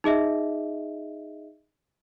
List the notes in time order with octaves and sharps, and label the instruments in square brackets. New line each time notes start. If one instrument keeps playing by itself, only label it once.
[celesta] D#4 G#4 D#5 E5